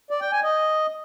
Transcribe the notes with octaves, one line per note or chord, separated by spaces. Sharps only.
D5
G5
G#5
D#5